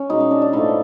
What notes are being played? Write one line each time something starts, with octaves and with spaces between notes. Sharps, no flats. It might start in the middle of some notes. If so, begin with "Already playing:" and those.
Already playing: C#4
B2 G#3 D#4
D#4
D4
D4
A2 F3 A3 D#4